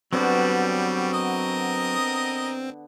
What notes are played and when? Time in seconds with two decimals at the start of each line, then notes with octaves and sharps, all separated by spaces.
0.13 D3 F#3 G3 B3 C4 F#4
1.14 A#4 D#5 D#6